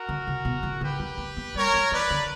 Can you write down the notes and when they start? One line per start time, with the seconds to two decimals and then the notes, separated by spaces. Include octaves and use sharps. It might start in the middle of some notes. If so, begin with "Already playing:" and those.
Already playing: F#4 A#4
0.09 D3
0.27 C#3
0.45 B2
0.63 C#3
0.81 D3 G4 B4
1.00 F#3
1.18 A#3
1.37 A#3
1.54 G3 A#4 C#5
1.74 F#3
1.92 E3 B4 D5
2.10 D3